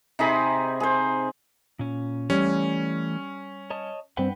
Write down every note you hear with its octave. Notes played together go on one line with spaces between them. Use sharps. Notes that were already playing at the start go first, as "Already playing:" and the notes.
C3 D#4 G#4 B5
G#4 C5
A#2 C#4
E3 G3 A3 C#4
C#5 D#5 A5
G2 C4 B4 F#5 G5